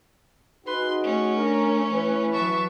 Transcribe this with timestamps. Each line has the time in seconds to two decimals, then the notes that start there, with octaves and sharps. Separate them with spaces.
0.67 D#4 F#4 G#4 B4 C6
1.02 A3 C#4 C#5
1.36 D4 A#4
1.91 E3 B4
2.33 F#3 E5 A5 C#6